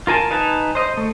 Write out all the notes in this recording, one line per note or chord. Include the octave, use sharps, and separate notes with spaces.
F4 A#4 G#5 A5
D#4 B4 G#5 A5
C5 D#5
A3